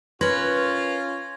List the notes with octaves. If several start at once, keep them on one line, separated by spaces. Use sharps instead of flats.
C#4 F4 A#4 B4 C6 G#6 A#6